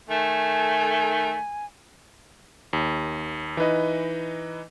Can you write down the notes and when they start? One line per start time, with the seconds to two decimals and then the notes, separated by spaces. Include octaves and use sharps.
0.09 D#3 A3 G#5
2.73 D#2
3.57 E3 D#4 B4 D#5